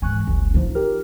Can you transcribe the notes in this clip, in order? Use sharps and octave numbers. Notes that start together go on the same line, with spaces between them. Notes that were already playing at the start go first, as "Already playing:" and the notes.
G#2 E3 G#5 C#6 F#6
F#1 C#2
A1 F3 D#4 F4
G4 A#4 F6